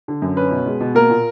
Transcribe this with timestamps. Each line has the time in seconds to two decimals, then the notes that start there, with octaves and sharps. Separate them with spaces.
0.08 D3
0.22 F#2
0.37 C#4 B4
0.51 B2
0.66 G#3
0.80 B2
0.95 A#3 A#4
1.10 A#2